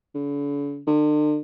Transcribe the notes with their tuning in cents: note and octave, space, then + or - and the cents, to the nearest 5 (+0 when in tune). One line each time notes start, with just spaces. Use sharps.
D3 -45
D3 +40